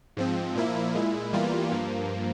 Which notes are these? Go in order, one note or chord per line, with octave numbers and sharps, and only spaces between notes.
G#2 F3 C4
A#2 F3 A#3 E4
A#2 G#3 E4
E2 E3 G3 A#3 F4
G2 F3 A#3